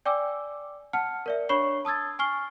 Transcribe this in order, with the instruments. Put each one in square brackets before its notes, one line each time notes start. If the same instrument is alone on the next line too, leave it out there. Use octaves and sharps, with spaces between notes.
[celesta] D5 G5 G#5 D6 E6
F#5 A5 F6 C#7
A#4 D5 E5
D4 C#5 B5 C#6 C7 G7
A5 D#6 E6 G#6 A6
G#5 C#6 F6 C7 G7